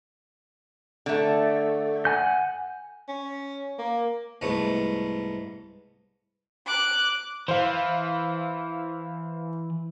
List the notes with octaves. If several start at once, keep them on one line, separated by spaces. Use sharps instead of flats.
D3 A3
F#5 G#5 G6
C#4
A#3
C2 G#2 A3 B3
D6 F#6
E3 C5 F5